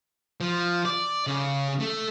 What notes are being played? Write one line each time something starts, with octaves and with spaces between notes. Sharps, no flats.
F3
D5
C#3
A3